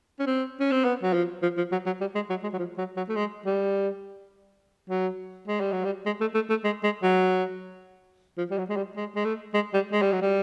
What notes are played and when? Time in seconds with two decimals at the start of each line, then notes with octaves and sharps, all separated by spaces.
0.19 C#4
0.26 C4
0.60 C#4
0.72 C4
0.84 B3
1.03 F#3
1.13 F3
1.42 F3
1.57 F3
1.72 F#3
1.86 F#3
2.01 G3
2.15 G#3
2.29 F#3
2.43 G#3
2.53 F#3
2.58 F3
2.78 F#3
2.97 F#3
3.09 A3
3.16 G#3
3.45 G3
4.90 F#3
5.48 G#3
5.61 G3
5.72 F#3
5.84 G3
6.06 G#3
6.21 A3
6.35 A3
6.50 A3
6.64 G#3
6.83 G#3
7.03 F#3
8.38 F3
8.51 G3
8.58 F#3
8.69 G#3
8.77 G3
8.96 G#3
9.16 G#3
9.25 A3
9.54 G#3
9.74 G3
9.92 G#3
10.02 G3
10.13 F#3
10.22 G3